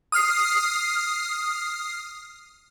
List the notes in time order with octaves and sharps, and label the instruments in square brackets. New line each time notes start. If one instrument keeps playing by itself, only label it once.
[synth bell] D#6 F6 C7